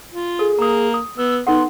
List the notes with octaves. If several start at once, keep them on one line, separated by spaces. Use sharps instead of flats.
F4
G#4 A4
A#3 A#5 D#6
D#6
B3 E6
B3 D#4 A4 F#5 C6